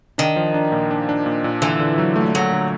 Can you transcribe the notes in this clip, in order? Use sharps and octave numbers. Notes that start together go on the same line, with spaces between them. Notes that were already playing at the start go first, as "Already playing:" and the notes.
D#3 D4
F3
D4
A#2
D4
D4
A#2
A#2
D3 E3
D3
F#3
A3
F#3 A3
D3